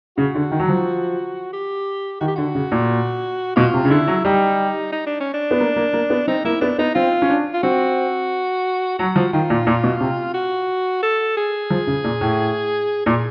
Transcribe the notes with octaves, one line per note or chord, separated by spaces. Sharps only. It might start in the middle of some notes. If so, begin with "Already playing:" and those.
C#3 F#4
D3
D#3
F#3
F3
G4
D#3 F#4
G4
D3 F#4
C#3
A#2
B2 F4
C3
C#3
D3 E4
F#3
G3 D#4
D#4
D4
C#4
D4
B3
A#3
A#3
A#3
B3
C4 D#4
A#3 E4
B3 D4
B3 D#4
C4 F4
C#4
D4
F4
C4 F#4
F#3 F#4
F3
D#3 F4
A#2
A#2
B2
C3
F#4
A4
G#4
F3
C#3
A#2
A2
A#2 G#4